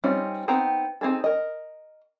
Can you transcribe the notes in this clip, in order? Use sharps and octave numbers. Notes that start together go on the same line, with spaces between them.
G3 C4 C#4 D#4 F4
B3 C4 D#4 G5 A#5
C4 D#4 G#4 A4
A#4 D#5